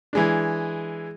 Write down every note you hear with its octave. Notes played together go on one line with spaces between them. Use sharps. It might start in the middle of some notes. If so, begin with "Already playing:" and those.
E3 G#3 D4